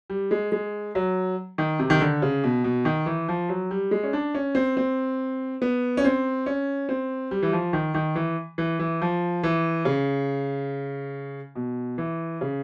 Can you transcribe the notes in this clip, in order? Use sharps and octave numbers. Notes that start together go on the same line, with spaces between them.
G3
G#3
G#3
F#3
D#3
C3
D#3
D3
C#3
B2
B2
D#3
E3
F3
F#3
G3
G#3
C#4
D4
C#4
C4
C4
B3
C#4
C4
C#4
C4
G3
E3
F3
D#3
D#3
E3
E3
E3
F3
E3
C#3
B2
E3
C#3